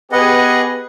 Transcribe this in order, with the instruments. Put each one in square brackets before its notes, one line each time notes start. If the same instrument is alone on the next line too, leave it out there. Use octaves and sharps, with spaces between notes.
[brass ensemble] B3 G4 G#4 [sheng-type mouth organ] B4 D#5 F#5